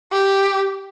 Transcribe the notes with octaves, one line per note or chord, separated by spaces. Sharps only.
G4